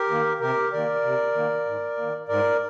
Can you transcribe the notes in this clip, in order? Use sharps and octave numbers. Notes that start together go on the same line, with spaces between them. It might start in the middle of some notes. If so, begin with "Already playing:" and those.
Already playing: G4 A#4
D#3 A#3
C3 G4 A#4
D#3 A#3 A#4 D5
C3
D#3 A#3
G#2
D#3 A#3
G#2 A#4 D5